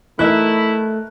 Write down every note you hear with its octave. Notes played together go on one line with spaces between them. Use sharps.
E3 A3 D#4 E4 A#4 E5 F#6